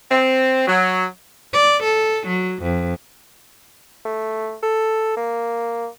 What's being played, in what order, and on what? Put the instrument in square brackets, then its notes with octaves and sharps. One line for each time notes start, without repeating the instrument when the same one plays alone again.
[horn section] C4
F#3
[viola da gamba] D5
A4
F#3
F2
[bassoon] A3
A4
A#3